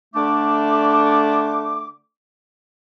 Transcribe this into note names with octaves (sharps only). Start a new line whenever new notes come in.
D3 A3 D4 D6